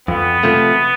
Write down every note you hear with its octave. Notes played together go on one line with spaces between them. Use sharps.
F2 B3
C3 F3 A3